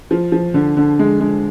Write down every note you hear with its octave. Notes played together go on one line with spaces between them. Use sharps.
F3
F3
D3
D3
G#3
G#3